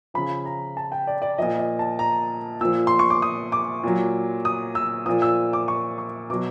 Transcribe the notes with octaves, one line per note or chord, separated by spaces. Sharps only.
C#3 F3 B5
A#5
A5
G5
D5
D5
A#2 F3 D#5
D#5
A5
A#5
A#2 F3 E6
C6
C#6
D6
D#6
D6
A#2 F#3
D#6
E6
A#2 F3 D#6
E6
D6
C#6
C#6
B2 F#3 D6